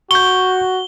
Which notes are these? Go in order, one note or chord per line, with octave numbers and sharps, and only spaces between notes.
F#4 C#6 G6 G7